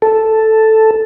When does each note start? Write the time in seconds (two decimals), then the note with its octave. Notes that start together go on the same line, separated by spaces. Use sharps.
0.02 A4